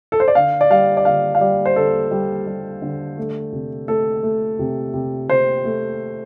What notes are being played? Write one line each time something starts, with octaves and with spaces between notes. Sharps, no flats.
A4
C5
D5
D3 F5
D5
G3 F5
D5
D3 F5
F5
G3 D5
C5
D3 A4
G3
G3
D3
A3
C3
A3 A4
A3
C3
C3
C3 C5
A3